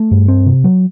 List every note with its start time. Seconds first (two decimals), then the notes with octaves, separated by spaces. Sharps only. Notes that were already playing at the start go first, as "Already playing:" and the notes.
Already playing: A3
0.11 G2
0.28 C4
0.46 C3
0.64 F#3